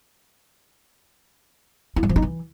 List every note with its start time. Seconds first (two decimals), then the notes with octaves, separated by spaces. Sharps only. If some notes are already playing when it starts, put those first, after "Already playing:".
1.96 E4
2.03 G3
2.09 F3
2.16 D#4
2.22 E3